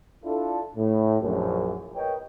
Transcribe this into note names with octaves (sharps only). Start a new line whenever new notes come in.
D4 E4 F4 A4
A2
A#1 F#2
A#4 B4 C#5 D#5 G5